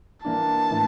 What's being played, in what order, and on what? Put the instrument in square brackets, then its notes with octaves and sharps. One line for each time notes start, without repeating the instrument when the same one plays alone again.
[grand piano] E3 A#3 D4 [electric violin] A5
[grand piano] A2 E3